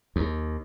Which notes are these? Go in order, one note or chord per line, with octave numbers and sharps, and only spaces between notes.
D#2